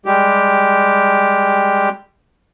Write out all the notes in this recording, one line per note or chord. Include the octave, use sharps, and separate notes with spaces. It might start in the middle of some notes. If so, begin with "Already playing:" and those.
G3 G#3 G4